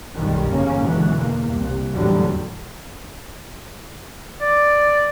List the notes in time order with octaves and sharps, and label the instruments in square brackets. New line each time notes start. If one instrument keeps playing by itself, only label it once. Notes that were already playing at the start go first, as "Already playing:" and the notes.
[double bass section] B1 F#2 A#2 D#3 G3
G1 E2 C#3 A#3 C#4
C#2 B2 D3 E3 F#3
E2 A#3
C2
E2 A2 D3 F#3 G3
[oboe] D5